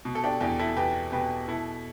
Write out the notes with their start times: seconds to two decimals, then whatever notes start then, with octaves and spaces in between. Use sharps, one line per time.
0.05 B2
0.15 A4
0.24 D4 G4
0.41 E2 D4 G4
0.59 E4 A4
0.77 E2 G4 B4
1.12 B2 G4 B4
1.48 B2 E4 A4